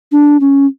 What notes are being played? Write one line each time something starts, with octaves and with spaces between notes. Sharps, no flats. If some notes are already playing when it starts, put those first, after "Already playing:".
D4
C#4